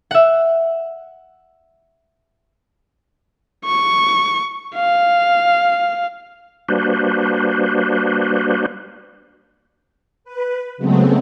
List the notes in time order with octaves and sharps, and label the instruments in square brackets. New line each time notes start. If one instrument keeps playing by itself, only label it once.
[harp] E5 F#5
[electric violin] C#6
F5
[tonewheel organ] G3 A#3 D4 F#4 B4 C5
[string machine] B4
C#3 F#3 G#3 A3 B3 C4